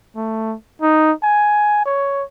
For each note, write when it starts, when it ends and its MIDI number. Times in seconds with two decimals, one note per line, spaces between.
0.16 0.56 57
0.82 1.12 63
1.23 1.85 80
1.86 2.23 73